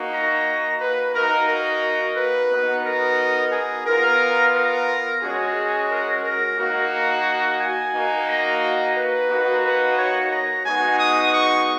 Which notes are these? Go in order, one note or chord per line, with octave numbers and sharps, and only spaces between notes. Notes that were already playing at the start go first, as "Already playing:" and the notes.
Already playing: A#3 D#4 F#4
A#5
B4
A#3 D#4 F#4 A#4
A#4
B4
B3 D#4 F#4
A#4
G#4
B3 F4 A#4
A#4
G#3 C#4 F#4 G#4
A#4
A#4
A#3 D#4 F#4
G#5
A#3 D#4 F#4
A#5
B4
A#3 D#4 F#4
B4
C#5
A#5
G#3 B3 D#4 F#4 G#5
D#6
C#6